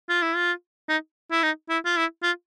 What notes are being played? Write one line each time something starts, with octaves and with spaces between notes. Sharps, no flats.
F4
E4
F4
D#4
E4
D#4
E4
F4
E4
F4